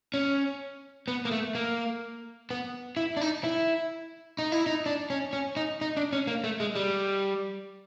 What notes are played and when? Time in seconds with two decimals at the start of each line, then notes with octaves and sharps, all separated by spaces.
0.14 C#4
1.08 B3
1.25 A#3
1.31 A3
1.55 A#3
2.51 B3
2.97 E4
3.17 D4
3.21 D#4
3.44 E4
4.39 D#4
4.52 E4
4.66 D#4
4.86 D4
5.10 C#4
5.33 C#4
5.57 D#4
5.81 D#4
5.97 D4
6.13 C#4
6.27 A#3
6.44 A3
6.60 G#3
6.75 G3